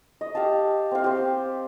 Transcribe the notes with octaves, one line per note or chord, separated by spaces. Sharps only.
D#5
G4 F5 A5
C4 F5
G4 C5